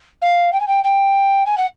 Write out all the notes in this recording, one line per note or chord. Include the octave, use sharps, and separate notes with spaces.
F5
G5
G#5
G5
G5
G#5
F#5